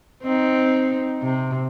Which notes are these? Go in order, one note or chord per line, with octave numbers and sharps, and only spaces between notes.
C4 D#4
C3